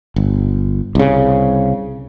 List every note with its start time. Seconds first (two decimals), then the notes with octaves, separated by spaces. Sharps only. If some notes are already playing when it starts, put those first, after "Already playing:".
0.16 G1
0.95 C2 C#3